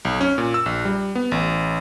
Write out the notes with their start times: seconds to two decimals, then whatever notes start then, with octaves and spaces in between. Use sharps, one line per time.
0.05 B1
0.21 C#4
0.38 A#2
0.54 E6
0.66 A#1
0.85 G3
1.15 B3
1.32 A1